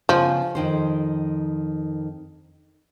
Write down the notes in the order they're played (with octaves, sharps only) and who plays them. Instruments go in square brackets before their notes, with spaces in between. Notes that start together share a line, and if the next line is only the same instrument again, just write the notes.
[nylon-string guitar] C#3 B3 G#5 [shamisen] F3
[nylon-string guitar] F2 D#3 C5